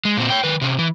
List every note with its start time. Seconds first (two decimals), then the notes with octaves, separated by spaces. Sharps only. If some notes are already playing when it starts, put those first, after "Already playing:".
0.05 G#3
0.17 A#2 C4
0.30 C#5 G5
0.44 D#3 B4
0.61 C3 C#4
0.79 E3